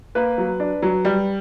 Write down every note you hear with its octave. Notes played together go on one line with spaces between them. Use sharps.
A#3 B4
F#3
D4
F#3
G3